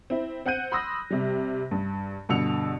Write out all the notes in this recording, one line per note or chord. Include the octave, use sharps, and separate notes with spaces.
C4 E4
C4 F#5 F#6 G6 D#7
B5 C6 D#6 E6 A#6
C3 G3
G2
G2 B2 D3 E6 C#7 F7